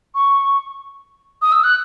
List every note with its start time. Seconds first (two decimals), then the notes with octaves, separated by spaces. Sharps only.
0.15 C#6
1.42 D#6
1.52 E6
1.64 F#6